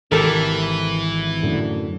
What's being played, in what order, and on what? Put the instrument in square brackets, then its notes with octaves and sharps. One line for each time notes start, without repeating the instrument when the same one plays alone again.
[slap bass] G#1 C3 [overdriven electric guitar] E3 [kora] G4 A4 A#4
[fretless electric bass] F#2 A2 D3